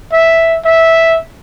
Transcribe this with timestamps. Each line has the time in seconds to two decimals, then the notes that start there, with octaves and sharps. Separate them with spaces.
0.12 E5
0.65 E5